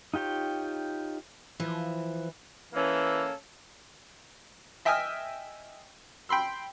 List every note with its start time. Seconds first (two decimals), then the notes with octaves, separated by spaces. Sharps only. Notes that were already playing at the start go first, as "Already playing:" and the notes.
0.14 D#4 F4 G4 C#5 G5
1.60 E3 F3
2.72 E3 A#3 C#4 A4
4.85 D#5 E5 G5 G#5 D#6 F6
6.29 G5 B5 C6 E6